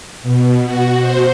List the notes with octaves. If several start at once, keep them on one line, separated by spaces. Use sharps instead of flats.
B2
F#4
C5